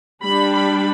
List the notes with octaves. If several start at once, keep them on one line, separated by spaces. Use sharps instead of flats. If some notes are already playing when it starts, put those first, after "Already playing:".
G3 D4 B5
B5